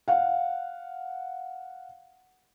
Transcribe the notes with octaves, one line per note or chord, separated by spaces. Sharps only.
F5 F#5